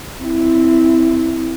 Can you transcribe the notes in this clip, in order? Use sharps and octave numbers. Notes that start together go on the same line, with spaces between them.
C4 E4